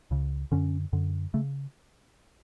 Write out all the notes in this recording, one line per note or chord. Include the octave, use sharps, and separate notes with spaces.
C#2 C#3
F#2 D3 C#4
F#2 D3
C#3 A3